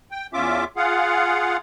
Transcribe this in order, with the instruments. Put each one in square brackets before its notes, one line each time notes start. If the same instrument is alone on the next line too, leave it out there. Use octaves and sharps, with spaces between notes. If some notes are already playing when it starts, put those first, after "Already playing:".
[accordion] G5
E2 C#4 F4 E5 D6
F4 G#4 F5 F#5